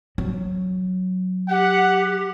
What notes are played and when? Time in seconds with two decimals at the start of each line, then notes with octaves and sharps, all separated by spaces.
0.18 F#3
1.50 G4 F#5